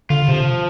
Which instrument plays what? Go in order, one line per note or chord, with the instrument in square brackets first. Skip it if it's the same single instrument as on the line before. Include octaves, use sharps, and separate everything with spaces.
[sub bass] D3 [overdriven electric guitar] F4
[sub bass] C3 [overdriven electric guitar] F3